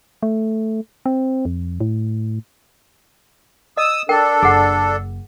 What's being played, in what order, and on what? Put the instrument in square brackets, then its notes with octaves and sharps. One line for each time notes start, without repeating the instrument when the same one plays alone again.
[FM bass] A3
C4
F2
A2
[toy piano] D#5 [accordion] D#6 E6
[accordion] D4 A4 [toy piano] A#4 G5
[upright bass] F#1 [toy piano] G#4 F#5